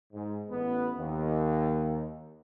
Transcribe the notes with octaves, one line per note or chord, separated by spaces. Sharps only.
G#2
A1 B3
D#2